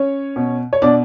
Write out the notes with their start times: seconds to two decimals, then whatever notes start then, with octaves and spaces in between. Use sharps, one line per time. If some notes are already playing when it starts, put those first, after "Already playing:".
Already playing: C#4 C#5
0.36 B2
0.73 C#5
0.82 B2 D4 D5